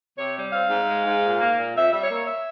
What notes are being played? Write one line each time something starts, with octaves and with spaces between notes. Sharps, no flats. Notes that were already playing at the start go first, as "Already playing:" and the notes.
C3 C#5
G3
C4 F5
G#2
G#3
G#2
A#2
A#3
A#2
F2 E5
G3 E5
C#5
A#3
E5